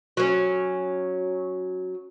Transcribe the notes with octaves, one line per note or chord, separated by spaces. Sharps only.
F#3 C#4